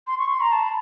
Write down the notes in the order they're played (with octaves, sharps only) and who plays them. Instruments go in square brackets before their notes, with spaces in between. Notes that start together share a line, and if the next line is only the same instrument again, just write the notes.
[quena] C6
C#6
C6
A#5
A5
B5